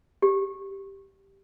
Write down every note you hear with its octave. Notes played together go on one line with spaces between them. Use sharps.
G4